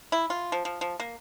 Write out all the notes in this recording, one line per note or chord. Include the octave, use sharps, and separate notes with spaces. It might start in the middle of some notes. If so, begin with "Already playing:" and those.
E4
F4
F3
F3
F3
A#3